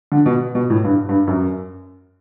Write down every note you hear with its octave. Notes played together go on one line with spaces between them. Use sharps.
D3
B2
B2
A2
G2
G2
F#2